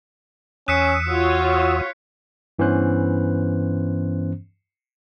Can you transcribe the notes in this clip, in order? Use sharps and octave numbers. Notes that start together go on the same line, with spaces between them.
E2 C#4 D#6 E6 F#6 B6 C#7
F4 F#4 C#5
G2 E3 B3 C#4 C5 F#6